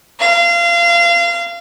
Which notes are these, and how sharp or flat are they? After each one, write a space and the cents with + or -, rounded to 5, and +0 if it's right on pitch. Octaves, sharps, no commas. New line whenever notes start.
F5 -25